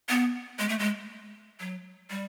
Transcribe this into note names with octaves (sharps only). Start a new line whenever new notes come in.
B3
G#3
A3
G#3
F#3
G3